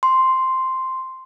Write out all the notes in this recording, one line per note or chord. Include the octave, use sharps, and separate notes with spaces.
C6